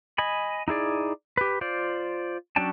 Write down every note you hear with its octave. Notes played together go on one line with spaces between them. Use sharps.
D#5 G#5 B5
D#4 E4 G#4 D5
G4 B4
F4 C5 D5
F#3 C#4 D4 G5 A5